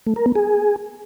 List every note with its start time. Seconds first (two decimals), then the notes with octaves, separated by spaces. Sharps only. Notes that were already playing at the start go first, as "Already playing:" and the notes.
0.07 A3
0.16 A#4
0.26 B3
0.35 G#4